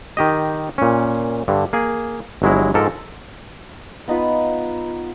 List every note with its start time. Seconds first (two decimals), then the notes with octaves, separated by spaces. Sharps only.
0.17 D#3 G4 D#5
0.78 A#2 C#4
1.48 G2 D3
1.73 A#3 G#4
2.42 G1 F#3 G#3 E4
2.74 G#2 F3 A4 A#4
4.08 B3 D#4 F4 B4